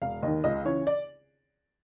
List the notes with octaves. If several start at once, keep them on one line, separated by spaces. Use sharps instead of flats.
E1 F5
D#2 D#3 D#5
C#2 D#5
C#3 E3 C#5
D5